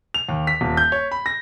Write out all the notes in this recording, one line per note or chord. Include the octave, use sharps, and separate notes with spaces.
F7
D#2
B6
D#1
G6
C#5
B5
A#6